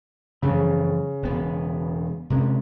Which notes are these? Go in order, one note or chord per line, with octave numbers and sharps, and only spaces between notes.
F#2 C#3 E3 F3
E1 B3
C3 G#3 C#4